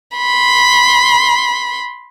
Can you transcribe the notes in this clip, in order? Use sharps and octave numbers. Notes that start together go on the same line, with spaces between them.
B5 C6